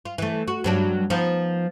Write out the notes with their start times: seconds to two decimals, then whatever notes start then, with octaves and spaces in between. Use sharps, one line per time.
0.05 F4
0.18 E3 A3
0.48 F#4
0.64 G2 F#3 D4
1.10 F3 B3 D#4